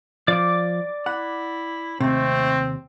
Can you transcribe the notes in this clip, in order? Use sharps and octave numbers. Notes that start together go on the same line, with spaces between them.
F3 D5 D6
E4 F#5
D#2 C3 A3 C4